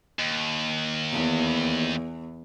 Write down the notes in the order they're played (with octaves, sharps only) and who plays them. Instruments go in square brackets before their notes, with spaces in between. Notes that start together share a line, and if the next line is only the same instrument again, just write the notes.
[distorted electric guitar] D#2
[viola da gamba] E2